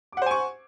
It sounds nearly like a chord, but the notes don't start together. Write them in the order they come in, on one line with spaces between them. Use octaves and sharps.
D6 F#5 C5 G#5 C#6